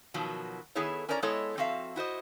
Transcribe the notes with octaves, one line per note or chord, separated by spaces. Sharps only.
B2 D#3 F3 F#3
D#3 B3 E4 G#4 A4 C#5
C#4 A#4 C#5 D5 A#5
G#3 B3 E4 A4 C#5 D#5
F2 C4 F#4 E5 F5
E4 F#4 C5 D#5